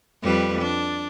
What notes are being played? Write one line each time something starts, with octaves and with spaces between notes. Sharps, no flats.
F2 G3 B4
D4